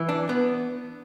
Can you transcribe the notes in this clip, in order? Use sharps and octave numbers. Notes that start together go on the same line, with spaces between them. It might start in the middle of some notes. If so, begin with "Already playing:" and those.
Already playing: E3
D4
B3